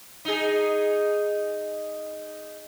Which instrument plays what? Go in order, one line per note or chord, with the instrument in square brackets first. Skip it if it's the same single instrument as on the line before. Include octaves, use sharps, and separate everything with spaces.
[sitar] D#4 G#4